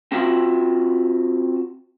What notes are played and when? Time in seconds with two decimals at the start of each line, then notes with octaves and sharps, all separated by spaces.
0.12 C4 F4 F#4 E5 B5